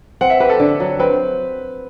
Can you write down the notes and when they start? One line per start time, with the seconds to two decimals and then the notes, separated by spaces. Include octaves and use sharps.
0.21 C4 F#5
0.30 E5
0.40 G4 B4
0.50 A4
0.60 D3
0.80 F#3
0.99 C4 B4